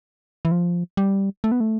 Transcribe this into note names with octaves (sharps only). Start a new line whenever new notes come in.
E3
F3
G3
A3
B3
A3